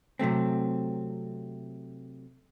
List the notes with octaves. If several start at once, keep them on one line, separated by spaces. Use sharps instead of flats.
C3 F#3 A3 C4